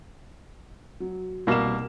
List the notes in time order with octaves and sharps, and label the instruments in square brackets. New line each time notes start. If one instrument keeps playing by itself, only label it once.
[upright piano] F#3
[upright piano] C2 E7 [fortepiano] B2 A#3